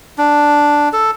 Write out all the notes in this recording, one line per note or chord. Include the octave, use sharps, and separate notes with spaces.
D4
A4